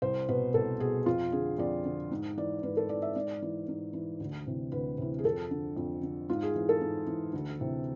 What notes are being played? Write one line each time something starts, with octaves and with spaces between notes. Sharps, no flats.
C2 C5
B2 B4
C2 A4
B2 G#4
F2 F4
D3 G#4
F2 D5
D3
G#2
E3 D5
G#2 B4
A4
E3 D5
E5
G#2 D5
E3
G#2
E3
D2
C3 E3
D2 B4
C3 E3
G#4
F2 A4
D3
F2
D3
G#2 F4
G#4
E3
A4
G#2
E3
D2
C3 E3